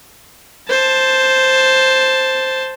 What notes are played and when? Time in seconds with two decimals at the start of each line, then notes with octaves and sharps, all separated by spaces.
0.70 C5 A5